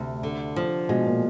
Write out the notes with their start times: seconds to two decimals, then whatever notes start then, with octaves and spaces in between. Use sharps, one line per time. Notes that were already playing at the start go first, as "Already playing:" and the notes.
Already playing: D2 C3
0.23 D3
0.56 F3
0.89 B2 G#3
1.06 A#2